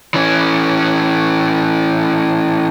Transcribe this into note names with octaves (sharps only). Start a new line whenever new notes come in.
E3 C#4